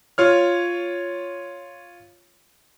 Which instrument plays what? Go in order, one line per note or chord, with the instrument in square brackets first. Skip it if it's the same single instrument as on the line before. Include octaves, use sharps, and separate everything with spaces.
[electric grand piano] F4 C#5 F6